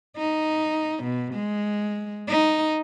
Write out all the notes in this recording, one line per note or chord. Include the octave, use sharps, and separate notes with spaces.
D#4
B2
G#3
D#4